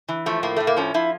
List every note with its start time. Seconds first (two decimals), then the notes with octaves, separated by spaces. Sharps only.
0.09 E3
0.26 F3 A3
0.43 A2 A#3
0.56 A2 A3
0.67 A#3
0.77 F3 C#4
0.94 F3 E4